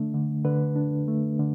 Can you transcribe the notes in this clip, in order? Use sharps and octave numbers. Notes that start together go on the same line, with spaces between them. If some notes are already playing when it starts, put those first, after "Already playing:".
Already playing: D3 A3 D4
D3
D3 B4
D4
A3
D3